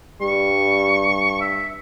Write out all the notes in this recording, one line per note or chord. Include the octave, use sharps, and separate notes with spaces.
G2 G3 C#6
E5